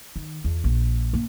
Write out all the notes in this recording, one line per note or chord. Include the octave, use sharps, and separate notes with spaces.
D#3
E2
A#1 F3
A#3 D4